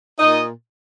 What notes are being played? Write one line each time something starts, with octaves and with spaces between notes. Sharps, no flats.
A#2 D#4 D#5